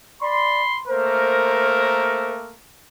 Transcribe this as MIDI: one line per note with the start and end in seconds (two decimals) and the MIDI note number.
0.21 0.62 74
0.21 0.81 83
0.21 0.81 84
0.88 2.55 57
0.88 2.55 58
0.88 2.55 70
0.88 2.32 72